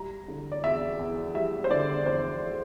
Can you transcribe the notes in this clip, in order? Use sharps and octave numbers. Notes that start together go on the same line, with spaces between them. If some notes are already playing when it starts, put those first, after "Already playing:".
Already playing: G3 A#5
D3
D5
E2 E5
E2
G3 E5
C5
D3 D5
E2 C5